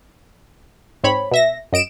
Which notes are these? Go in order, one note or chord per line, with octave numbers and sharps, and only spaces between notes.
G#2 C4 C#5 B5
B2 E5 A#6
F#2 D#5 D7 E7